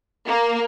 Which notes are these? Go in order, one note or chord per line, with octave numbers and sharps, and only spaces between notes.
A#3